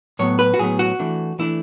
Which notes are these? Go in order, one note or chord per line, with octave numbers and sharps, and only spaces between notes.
A2 F#3 B3 C#5
B4
F#4
A2 F#3 B3 G#4
F#4
E3 A3 D4
E3 A3 D4 E4